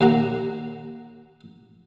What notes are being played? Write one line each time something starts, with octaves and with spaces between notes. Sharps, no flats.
D#2 A#3 F#4 A#5